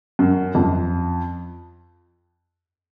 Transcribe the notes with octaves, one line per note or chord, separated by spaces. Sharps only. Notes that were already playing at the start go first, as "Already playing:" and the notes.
F#2
F2